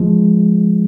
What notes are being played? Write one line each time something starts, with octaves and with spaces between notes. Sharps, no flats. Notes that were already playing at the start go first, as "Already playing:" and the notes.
Already playing: F3 G#3